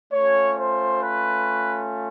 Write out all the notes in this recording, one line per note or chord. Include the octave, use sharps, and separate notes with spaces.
A3 C#4 F4 C#5
C5
B4